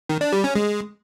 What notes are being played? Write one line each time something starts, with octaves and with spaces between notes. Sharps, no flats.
D#3
D4
G3
C#4
G#3